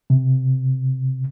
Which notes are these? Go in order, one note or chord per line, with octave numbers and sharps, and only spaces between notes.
C3